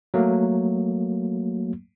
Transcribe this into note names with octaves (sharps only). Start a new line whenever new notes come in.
F#3 A3 A#3